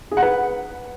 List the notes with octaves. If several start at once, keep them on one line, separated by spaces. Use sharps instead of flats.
G#4
F#5
B4